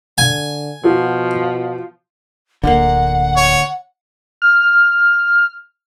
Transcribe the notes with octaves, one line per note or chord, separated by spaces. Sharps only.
D3 G#5
B2 F3 F#4
D1 G#1 D3 A#3 F#5
C#5
F6